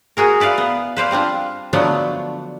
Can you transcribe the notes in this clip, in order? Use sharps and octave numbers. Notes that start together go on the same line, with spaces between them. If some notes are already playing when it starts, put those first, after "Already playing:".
F#4 G#4 A#4
E4 B4 D5 F5
B3
B4 C5 D5 F5
G3 C4 D4 F4
D3 F3 F#3 A3 B3 D4